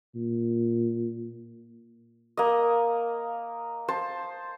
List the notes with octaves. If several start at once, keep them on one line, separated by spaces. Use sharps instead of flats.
A#2
A#3 D#5
C5 A5